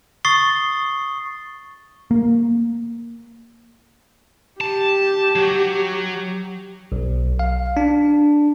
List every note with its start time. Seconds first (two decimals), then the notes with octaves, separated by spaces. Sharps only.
0.25 C#6 D#6 A6 C7 G7
2.11 A#3
4.61 G4 A5
5.36 F#3
6.92 B1
7.39 F5
7.77 D4